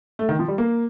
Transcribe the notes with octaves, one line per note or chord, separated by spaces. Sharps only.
A3
D#3
F3
G3
A#3